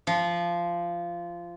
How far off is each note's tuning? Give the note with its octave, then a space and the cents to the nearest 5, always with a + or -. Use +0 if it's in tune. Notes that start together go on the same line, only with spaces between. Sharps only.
F3 -15